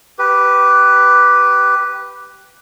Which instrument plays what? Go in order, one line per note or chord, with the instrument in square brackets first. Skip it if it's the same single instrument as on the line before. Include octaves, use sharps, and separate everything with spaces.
[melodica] G4 B4